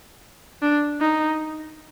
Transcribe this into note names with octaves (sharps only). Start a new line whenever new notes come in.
D4
D#4